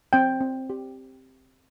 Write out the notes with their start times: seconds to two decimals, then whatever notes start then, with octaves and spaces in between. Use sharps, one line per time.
0.13 C4 G5
0.41 C4
0.70 G4